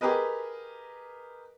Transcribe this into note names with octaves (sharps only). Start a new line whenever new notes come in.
G4 G#4 A#4 B4 D#5